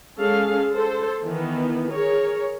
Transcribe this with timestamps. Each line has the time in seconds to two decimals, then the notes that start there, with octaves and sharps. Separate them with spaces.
0.19 G#3 C#4 G#4 A4 F5
0.73 A4 C5
1.23 D#3 E3 B3
1.90 G#4 A#4 C#5